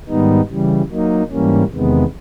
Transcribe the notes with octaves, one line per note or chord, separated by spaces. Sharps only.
G#2 D#3 G3 B3 D#4
C#3 E3 G3
F#3 A#3 D#4
G#2 E3 G3 A#3 C#4
E2 C3 D#3 G#3 B3